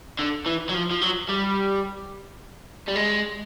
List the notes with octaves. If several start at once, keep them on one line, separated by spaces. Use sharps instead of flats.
D3
E3
F#3
F3
F3
F#3
G3
G3
G#3